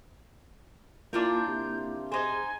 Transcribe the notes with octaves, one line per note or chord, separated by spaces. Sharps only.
A#2 A#3 D4 E4 F4 A#4 G6
C3
D#4 G#4 C5 G#5